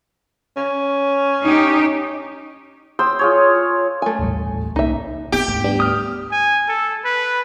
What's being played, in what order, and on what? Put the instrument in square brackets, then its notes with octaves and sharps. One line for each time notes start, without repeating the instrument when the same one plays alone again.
[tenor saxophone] C#4
[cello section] D#4 G4
[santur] G5 C6 D#6 E6
F4 G#4 C#5
[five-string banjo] A3 G#5
[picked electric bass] D#1 A1 G3
[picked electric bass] C2 G3 A#3 [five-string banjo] D#4 E5
[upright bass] B3 C4 [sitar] G4
[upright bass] D2 G#2
[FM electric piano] G3 B3 D4
[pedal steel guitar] D#6 F6
[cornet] G#5
A4
B4